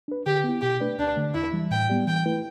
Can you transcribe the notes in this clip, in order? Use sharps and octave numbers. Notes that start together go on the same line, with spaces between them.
D4 B4
D3 G4
B3 E4
B2 G4
A3 D4 B4 D5
D2 D4
D3 A3
E2 E4
E3 G3
A2 G5
G3 B3 G4 D5
E3 G5
A3 E4 B4